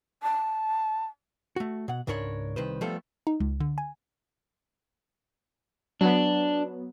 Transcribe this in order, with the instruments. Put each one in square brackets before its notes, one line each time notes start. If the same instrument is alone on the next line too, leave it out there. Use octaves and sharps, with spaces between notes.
[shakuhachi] A5
[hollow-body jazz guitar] A3 F#4
B2 F#5
C#2 G#2 D4 A#4 C#5 B5
C2 D#3 B4 C5
F3 G3 A3 B3 A4
[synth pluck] D#4
C#2
D3
G#5
[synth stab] F#3 B3 [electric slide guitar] D4